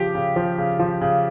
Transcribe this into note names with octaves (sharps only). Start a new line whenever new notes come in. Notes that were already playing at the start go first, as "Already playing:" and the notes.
Already playing: C#3 F3 G4
C#3
F3
C#3
F3
C#3